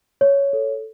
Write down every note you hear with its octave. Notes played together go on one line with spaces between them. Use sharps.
C#5
A4